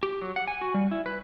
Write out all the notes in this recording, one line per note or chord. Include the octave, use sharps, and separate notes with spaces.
G4
F#3
F#5
G#5
F#4
G3
E4
B4